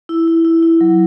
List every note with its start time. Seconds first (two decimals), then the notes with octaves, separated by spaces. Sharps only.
0.09 E4
0.28 E4
0.45 E4
0.63 E4
0.81 F#3